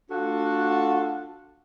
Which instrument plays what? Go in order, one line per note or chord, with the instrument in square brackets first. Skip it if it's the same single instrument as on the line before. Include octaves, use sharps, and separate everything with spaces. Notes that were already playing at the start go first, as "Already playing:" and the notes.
[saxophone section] A3 D4 F4 F#4 A4 F#5